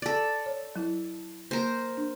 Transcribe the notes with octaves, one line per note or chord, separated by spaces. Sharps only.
A4 D5
C#5
F#3 E4
A#3 A#4 C5
D4